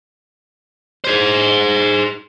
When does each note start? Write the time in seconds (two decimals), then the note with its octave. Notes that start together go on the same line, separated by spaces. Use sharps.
1.04 G#4 C5